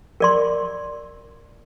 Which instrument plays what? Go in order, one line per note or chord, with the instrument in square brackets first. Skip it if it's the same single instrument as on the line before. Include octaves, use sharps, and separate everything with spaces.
[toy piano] A#4 D5 C6